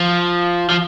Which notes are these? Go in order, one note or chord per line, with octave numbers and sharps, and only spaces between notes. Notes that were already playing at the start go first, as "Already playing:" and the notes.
Already playing: F3
F3